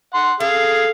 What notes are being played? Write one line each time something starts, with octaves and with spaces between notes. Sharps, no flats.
F#5 C6
G#4 A4 F5